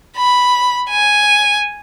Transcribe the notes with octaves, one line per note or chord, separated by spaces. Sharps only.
B5
G#5